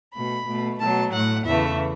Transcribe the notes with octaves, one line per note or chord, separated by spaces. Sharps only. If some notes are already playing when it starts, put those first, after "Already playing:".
B2 A3 B5
B2 A3
B2 F#3 A3 A5
A2 A3 F#5
E2 C#3 E3 A3 E5